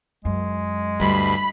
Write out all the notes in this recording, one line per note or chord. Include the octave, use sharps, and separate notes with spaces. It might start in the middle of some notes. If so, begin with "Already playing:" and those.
F#2 G#3
D2 G2 G3 B5 C7